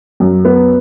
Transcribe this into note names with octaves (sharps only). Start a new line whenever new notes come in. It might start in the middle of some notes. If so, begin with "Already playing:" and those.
F#2
B3